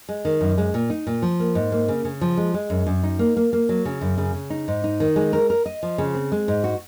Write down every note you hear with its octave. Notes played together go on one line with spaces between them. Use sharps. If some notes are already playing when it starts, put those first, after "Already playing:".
G#3
D#3
F#2
G#3
A#2
D#4
A#2
F3
A#3
G#2
A#3
C#3
C#3
F3
G#3
G#3
F#2
F#2
D#4
A#3
A#3
A#3
F#3
C#3
F#2
C#3
C#3
D#4
G#2
D#4
D#3
G#3
A#4
A#4
D#5
F3
C#3
C4
G#3
G#2
F#4